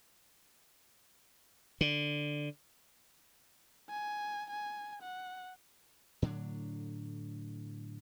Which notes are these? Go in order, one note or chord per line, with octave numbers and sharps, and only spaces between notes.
D3
G#5
G#5
F#5
A2 D3 F#3 D4